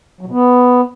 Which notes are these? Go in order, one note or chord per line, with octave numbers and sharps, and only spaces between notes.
F#3
B2
B3